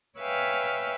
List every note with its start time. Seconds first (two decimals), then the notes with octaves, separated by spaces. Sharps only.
0.19 B4 C#5 E5 F5 G5 G#5